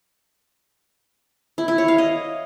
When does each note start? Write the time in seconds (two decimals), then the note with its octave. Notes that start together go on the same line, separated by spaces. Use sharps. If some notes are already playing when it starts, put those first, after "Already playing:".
1.58 E4
1.68 E4
1.78 C#5
1.88 F5
1.98 D#5